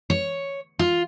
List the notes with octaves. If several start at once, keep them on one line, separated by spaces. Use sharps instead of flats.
C#5
F4